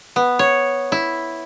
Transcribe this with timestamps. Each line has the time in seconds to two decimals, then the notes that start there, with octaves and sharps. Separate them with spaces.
0.16 B3
0.39 C#5
0.92 E4